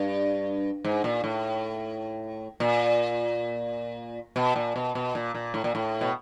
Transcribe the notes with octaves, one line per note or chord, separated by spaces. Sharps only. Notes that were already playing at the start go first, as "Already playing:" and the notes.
Already playing: G2
G#2
A#2
A2
A#2
B2
A#2
B2
B2
A#2
A#2
A2
A#2
A2
B2